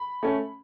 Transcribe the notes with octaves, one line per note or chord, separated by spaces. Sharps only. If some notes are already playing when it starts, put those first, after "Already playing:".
Already playing: B5
A3 C#4